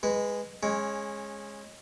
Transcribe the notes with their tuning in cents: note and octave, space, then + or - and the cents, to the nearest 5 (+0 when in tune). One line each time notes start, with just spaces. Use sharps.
G#3 -10 B4 +0
G#3 +0 C#4 -20